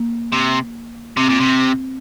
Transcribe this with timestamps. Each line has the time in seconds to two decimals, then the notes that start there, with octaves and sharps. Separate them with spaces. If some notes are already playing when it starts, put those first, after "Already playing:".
Already playing: A#3
0.33 C3
1.16 C3 C4
1.29 A#2
1.40 C3